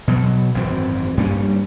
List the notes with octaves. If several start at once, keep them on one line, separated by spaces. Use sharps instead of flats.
B2 F#3
G#1 F#2 E3 C4
G2 G3 A#3 C#4